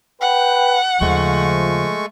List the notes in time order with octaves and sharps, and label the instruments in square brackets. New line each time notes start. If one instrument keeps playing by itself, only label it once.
[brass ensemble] B4 G5 [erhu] F#5
[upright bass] D#2 C#3 [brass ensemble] F3 [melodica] G#3 A3 C#6